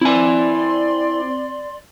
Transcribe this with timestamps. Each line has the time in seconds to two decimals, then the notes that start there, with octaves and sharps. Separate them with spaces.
0.01 C4 E4 D5 G#5 C6